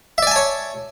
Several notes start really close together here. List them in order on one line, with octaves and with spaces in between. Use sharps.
E5 D5 G#5 A5 C#5